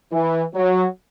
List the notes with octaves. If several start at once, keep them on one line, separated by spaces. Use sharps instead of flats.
E3
F#3